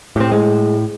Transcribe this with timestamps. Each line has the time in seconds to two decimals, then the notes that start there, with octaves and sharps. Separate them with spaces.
0.16 A2 C4 G4
0.32 G#3